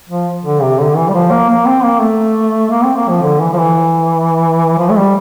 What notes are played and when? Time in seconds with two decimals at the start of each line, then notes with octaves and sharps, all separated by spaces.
0.09 F3
0.44 D3
0.62 C3
0.79 D3
0.96 E3
1.08 G3
1.14 F3
1.31 A#3
1.49 A#3
1.66 C4
1.84 A#3
2.00 A3
2.70 A#3
2.84 C4
2.97 A#3
3.09 F3
3.22 D3
3.40 E3
3.53 F3
3.58 E3
4.78 F3
4.90 A3
4.96 G3